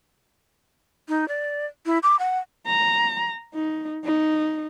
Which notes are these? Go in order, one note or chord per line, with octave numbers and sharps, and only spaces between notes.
D#4
D5
E4
D6
F#5
A#5
D#4
D#4